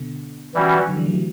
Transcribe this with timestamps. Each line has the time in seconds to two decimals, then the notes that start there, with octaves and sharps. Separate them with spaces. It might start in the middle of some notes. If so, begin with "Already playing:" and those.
Already playing: B2 D3
0.54 E3 G3 C#4 F#4
0.88 D3 F#3
0.97 E3 G3
1.05 F#3 A3
1.13 E3 G3